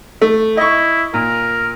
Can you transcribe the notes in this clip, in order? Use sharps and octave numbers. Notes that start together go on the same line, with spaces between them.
A3
E4 D#5 C#6
A#2 A#4